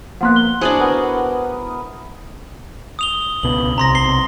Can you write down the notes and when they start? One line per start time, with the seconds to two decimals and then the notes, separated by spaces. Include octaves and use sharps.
0.21 F3 A#3 B3 F#5 C6 F#6
0.36 G7
0.61 D4 E4 F#4 G#4 C5 D#6
0.80 B3 A#4
2.99 D#6 F7 G7
3.43 C#2 B2 F#7
3.78 B1 C3 A#5 C6 A#6
3.95 C7 G7